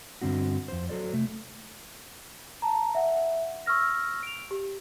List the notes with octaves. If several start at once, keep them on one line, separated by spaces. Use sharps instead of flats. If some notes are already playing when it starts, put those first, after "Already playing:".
G2 D3 C4 F#4
F2 C5
F#3 F#4 A4 C5 D5
C3 A3
A5 A#5
E5 F#5
C#6 E6 F6 A#6
D7 F7
G4